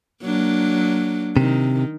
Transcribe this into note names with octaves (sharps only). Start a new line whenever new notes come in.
F#3 A#3 D4
C3 D#3